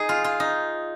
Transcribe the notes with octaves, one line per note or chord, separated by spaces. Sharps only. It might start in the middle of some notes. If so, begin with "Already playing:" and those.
Already playing: D#4 G#4
F4
F4
D#4